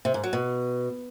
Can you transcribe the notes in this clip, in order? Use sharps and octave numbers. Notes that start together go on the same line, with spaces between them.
C3
G#2
F#3
B2